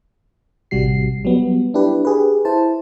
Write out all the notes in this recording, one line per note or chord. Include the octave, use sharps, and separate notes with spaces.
A1 C3 G3 F#4 C7
F#3 G3 B3
D4 E4 G4 B4
G4 G#4 B4
E4 C5 A5